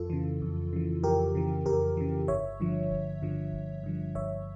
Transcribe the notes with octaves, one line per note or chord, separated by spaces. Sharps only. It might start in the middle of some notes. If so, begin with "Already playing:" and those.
Already playing: F2 F4 A4
C#3 E3
F2
C#3 E3
F2 G4 A#4
C#3 E3
F2 G4 A#4
C#3 E3
G1 C#5 E5
G2 D3 F3
G1
G2 D3 F3
G1
G2 D3 F3
G1 C#5 E5